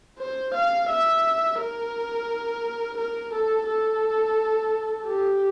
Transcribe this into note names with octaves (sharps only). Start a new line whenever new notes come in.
C5
F5
E5
A#4
A#4
A4
A4
G4